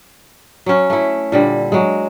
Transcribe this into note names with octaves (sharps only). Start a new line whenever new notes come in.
F#3 C#4
A3 E4
A#2 D3 G3
F#3 G#3